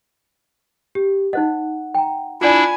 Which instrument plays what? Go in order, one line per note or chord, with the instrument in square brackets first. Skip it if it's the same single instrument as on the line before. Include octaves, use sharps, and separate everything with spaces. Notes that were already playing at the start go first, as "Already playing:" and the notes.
[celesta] G4
[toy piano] D#4 C5 D#5 [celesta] F#5
[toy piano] G5 A#5
[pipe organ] D4 E4 [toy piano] F4 D5 [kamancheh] G#5 B5